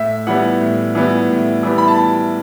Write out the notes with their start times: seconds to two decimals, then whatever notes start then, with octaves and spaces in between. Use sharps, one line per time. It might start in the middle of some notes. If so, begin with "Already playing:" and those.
Already playing: A2 E5
0.27 E3 G3 B3 F#5
0.61 A2
0.95 E3 G3 B3
1.30 A2
1.63 E3 G3 B3
1.78 B5
1.88 A5